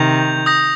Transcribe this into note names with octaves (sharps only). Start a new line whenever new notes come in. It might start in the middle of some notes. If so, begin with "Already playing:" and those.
Already playing: C3 D#3 G6 F7
D#6 G6 A#6